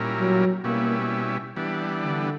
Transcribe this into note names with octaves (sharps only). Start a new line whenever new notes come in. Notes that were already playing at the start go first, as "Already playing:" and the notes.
Already playing: A#2 G3 C#4 E4 A#4
F#3
B2 G3 A#3 C#4 E4
E3 G3 B3 D4
D3